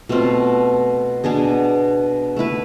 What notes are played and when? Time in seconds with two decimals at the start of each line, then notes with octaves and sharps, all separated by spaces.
0.09 B2 A3 C4 F4
1.24 B2 B3 D4 G#4
2.36 A3 E4 B4